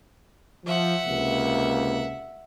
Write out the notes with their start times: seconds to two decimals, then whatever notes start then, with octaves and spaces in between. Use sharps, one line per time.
0.66 F3 E5 F#5
1.06 C#2 C3 A#3